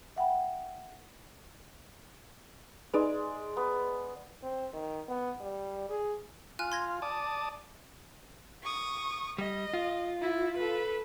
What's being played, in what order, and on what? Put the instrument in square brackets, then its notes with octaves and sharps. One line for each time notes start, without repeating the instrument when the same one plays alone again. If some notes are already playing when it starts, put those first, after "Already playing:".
[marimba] E5 F#5 G5 B5
[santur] G#3 D5 [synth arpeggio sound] D#4 G#4 B4
[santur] B3
[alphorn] C4
D#3
B3
G3
G#4
[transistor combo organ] F4 [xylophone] G#5 F6 F#6
[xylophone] C6 G#6 A#6
[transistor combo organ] D5 A5 D#6
[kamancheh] C#6 D#6
[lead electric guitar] G3 [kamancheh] D#5
[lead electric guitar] F4
[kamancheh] E4
A4 B4